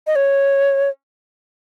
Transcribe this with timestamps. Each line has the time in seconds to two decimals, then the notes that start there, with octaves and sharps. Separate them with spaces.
0.07 D#5
0.15 C#5